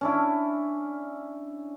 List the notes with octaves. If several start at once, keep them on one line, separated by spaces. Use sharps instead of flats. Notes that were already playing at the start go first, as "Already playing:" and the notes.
C#4 D4 E4